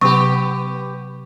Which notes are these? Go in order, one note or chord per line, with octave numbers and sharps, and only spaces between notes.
C3 F#3 B3 G4 C#6